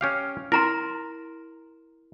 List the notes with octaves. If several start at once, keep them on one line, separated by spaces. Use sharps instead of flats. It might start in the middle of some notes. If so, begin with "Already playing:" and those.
C#4 G4 F5
E4 A#4 A#5 C6